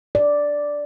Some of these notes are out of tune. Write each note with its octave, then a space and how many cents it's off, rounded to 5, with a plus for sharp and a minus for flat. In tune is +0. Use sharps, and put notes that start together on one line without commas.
D5 -5